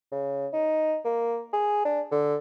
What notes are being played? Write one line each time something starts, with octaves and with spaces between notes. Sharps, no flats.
C#3
D#4
A#3
G#4
D4
D3